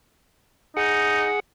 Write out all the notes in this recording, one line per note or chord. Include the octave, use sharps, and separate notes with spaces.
D#4 G#4 F#5